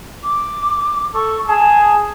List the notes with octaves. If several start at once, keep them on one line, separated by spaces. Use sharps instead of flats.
D6
A4 C#6
G#4 A5